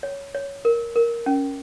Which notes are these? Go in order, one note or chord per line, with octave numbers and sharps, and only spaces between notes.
C#5
C#5
A#4
A#4
C#4